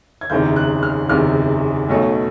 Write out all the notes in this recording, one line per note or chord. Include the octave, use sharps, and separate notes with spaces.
G#6
F#1 E2 C3 D#3 G6
F#6
F6
F#1 E2 C3 D#3 F6
B1 B2 F#3 A3